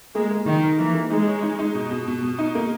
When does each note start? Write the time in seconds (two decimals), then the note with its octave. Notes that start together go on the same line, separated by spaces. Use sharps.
0.15 G#3 A#3
0.31 A#3
0.47 D#3 D#4
0.64 A#4
0.78 E3 A#3
0.95 A#3
1.10 G#3 D#4
1.27 C#5
1.43 D#4
1.59 D#4
1.75 B2
1.91 B2
2.07 B2
2.23 B2
2.38 D#4
2.55 A#3